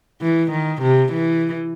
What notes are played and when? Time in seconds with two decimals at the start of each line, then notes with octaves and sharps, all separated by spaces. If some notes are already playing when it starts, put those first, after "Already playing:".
0.21 E3
0.51 D#3
0.82 C3
1.13 E3